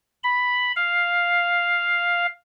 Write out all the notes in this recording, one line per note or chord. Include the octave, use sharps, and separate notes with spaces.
B5
F5